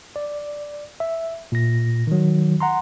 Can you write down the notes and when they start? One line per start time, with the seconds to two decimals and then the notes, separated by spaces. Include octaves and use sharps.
0.16 D5
1.00 E5
1.52 A#2 A#6
2.07 D#3 F#3
2.60 F#5 A#5 C6